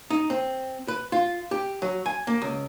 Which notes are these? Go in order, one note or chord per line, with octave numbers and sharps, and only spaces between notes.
D#4
C4
B4
F4
G4
F#3
G#5
A#3
C#2